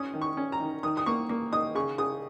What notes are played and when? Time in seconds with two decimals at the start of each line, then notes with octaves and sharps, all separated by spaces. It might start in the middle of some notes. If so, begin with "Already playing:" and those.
Already playing: C#4 D#6
0.14 D#3
0.22 C#6
0.37 C#4
0.52 A#5
0.60 D#3
0.83 D#3 D#6
0.97 D#6
1.06 A#3 C#6
1.29 A#3
1.52 D#4 D#6
1.75 C#3 C#6
1.98 C#3 D#6